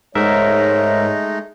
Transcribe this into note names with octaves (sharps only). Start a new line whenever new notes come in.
G#2 G#3 A3 D#4 A#4 C#5 E5